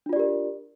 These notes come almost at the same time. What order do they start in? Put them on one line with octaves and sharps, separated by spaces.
D4 F4 D5 G4 A#4